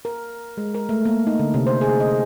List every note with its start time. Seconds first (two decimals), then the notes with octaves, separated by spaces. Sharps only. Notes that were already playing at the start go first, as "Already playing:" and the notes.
0.05 A#4
0.57 G#3
0.74 A#4
0.89 A3
1.05 A#3
1.27 D#4
1.39 D3
1.54 C3
1.67 C5
1.81 G#4
2.00 D#5